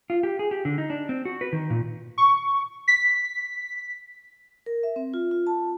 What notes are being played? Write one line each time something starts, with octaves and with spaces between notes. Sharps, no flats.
F4
G4
G#4
G4
D3
D#4
D4
C4
F#4
B4
D#3
A#2
C#6
B6
A#4
E5
C4
F4
F4
A5